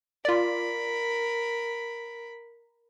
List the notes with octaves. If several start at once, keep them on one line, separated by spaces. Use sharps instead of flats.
F4 A#4 D5 B5